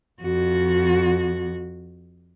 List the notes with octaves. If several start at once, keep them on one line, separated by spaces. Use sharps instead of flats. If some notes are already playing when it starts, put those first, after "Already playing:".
F2 F#4